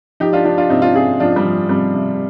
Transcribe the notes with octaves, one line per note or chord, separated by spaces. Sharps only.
F3 D#4 G4
D4 F4
F3 D4 F4
D4 F4
C3 C4 D#4
D4 F4
C3 F4 G#4
F3 D4 F4
G3
F3
C3 G3
C3